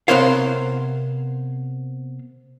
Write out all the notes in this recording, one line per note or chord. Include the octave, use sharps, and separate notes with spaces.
C3 B3 A#4 C5 C#5 F5